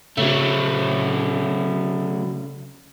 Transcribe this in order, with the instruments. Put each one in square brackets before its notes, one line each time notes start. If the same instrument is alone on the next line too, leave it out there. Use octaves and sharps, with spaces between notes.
[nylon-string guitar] C#3 [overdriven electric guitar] F#3 A3